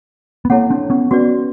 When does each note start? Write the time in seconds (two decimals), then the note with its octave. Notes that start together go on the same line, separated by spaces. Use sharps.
0.45 B3
0.50 A#3 C4 E4 A4 C#5 F#5
0.70 C4 D4
0.90 B3 C#4
1.11 B3 C#4 F#4 B4 D5